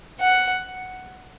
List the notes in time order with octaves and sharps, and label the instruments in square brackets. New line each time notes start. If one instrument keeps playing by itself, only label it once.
[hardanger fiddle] F#5